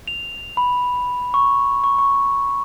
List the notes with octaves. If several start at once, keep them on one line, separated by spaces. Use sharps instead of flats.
F7
B5
C#6
C#6
C#6